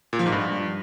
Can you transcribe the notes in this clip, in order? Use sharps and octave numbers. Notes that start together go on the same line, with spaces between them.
A#2
F3
G#2
G2